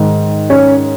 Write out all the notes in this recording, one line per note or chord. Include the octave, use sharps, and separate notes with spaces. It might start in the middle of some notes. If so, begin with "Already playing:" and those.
Already playing: G#2 D#3
C#4